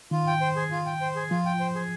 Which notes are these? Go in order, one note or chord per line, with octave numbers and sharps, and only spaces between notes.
D#3 F4
G5
C5
G#4
F4
G5
C5
G#4
F3 F4
G5
C5
G#4